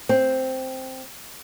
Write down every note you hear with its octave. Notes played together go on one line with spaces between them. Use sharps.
C4